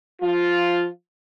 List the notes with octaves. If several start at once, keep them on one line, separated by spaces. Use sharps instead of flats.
F3 F4